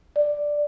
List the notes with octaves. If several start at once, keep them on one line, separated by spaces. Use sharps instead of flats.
D5